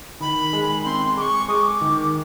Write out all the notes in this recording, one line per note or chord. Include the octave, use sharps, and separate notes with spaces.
D#3 B5
G#3
C4 C6
G#3 C#6 D6
G#3 D6 D#6
D#3